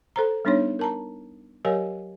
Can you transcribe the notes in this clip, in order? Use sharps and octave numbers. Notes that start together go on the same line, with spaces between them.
A4 C5 A#5
G3 B3 D4 D#4 C#5
A#4 A5 A#5
F#3 G4 A#4 C#5 F5 G#5